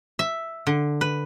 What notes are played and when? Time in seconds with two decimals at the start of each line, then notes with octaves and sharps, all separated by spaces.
0.19 E5
0.67 D3
1.01 B4